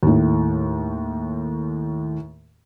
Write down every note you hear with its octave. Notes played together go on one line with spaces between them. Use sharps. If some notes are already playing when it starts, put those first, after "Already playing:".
D#2 A2